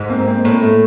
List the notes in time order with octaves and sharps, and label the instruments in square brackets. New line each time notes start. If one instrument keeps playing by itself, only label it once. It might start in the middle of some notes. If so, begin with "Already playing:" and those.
Already playing: [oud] G#2
[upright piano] A#3 C4
A#3 C4
[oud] A2 [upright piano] A#3
[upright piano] A3